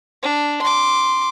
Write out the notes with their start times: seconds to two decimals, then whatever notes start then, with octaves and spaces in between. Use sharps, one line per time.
0.22 D4
0.62 C6 D6